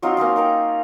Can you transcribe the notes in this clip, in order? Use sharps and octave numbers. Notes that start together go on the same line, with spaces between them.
F#3 C4 D#4 F4
A#3 C4 C#4 D#4
D#4 A#4 G5